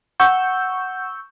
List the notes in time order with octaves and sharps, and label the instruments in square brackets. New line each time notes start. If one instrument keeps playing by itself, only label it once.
[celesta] F#5 [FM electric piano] C#6 E6 G6